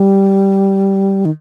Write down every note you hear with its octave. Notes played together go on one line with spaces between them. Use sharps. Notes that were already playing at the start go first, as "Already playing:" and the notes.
Already playing: G3
D#3